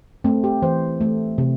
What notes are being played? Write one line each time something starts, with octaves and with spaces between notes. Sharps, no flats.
A3 C4
G4
E3 C5
A3
C3